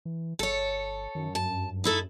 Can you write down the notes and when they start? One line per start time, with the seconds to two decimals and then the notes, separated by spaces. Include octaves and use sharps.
0.05 E3
0.39 G1 A4 C#5
1.15 F#2 D#3
1.35 G2 A5
1.84 D#4 E4 A4